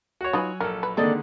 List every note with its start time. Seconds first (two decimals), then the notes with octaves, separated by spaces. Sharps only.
0.21 F#4 C#5
0.33 F#3 D#4 F4 B4 G#5
0.60 A#1 A4 A#4
0.83 B4
0.97 D3 D#3 G#3 A#3 C4 A4 D5 D#5